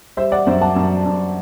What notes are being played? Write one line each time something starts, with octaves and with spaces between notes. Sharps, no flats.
G3 C5 E5
D5 F#5
F#2 C5 E5
F#5 A5
F#2
F#2